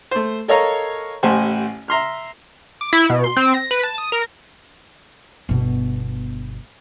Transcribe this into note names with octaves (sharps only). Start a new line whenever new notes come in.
A3 C5
A4 A#4 C#5 D#5 F5 A#5
A1 A2 G4 C5 F#5 G#5
E5 A#5 C6 F6
D6
E4
B2
C6
C4
A#6
B4
A5
D#6
A#4
G1 B2